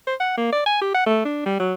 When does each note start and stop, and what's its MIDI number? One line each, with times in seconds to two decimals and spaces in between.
0.07 0.15 72
0.20 0.34 78
0.37 0.51 58
0.53 0.62 74
0.66 0.79 80
0.81 0.94 67
0.95 1.02 78
1.06 1.21 57
1.25 1.43 62
1.46 1.59 55
1.60 1.74 54